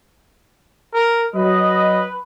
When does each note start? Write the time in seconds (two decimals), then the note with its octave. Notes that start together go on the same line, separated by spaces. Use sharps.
0.94 A#4
1.35 F#3 B4 D#5